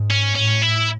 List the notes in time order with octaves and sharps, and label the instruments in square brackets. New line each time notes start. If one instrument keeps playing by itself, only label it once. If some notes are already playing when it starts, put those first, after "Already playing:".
Already playing: [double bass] G#2
[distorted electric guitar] C#4
[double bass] A2 [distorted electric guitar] C#4
[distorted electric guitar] E4